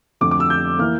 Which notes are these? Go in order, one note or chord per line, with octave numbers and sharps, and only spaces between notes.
F2 D3 A3 D6
D6
E6
G6
E3 A#3 F6